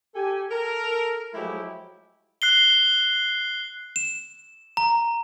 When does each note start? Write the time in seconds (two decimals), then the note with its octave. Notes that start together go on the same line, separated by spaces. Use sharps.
0.14 G4 A4 G#5
0.50 A4 A#4
1.34 F3 F#3 G#3 A3 E4 G4
2.42 F#6 C7 G7
3.96 E7
4.77 A#5